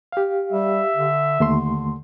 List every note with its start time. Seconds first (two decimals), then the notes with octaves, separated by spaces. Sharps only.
0.12 G4 F5
0.52 G3 E5
0.96 D3
1.40 D#2 D3 A3 C6